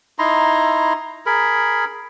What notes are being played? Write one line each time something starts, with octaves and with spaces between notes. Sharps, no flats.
D#4 E4 A#5 C6
G#4 A#4 B5